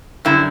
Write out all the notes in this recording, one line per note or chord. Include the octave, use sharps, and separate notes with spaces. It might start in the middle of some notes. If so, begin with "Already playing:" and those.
F#2 D3 G3 E4